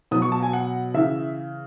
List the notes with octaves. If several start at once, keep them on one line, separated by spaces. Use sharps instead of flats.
B2 F#3 D#6
C#6
A5
G#5
F#5
C#3 E3 E5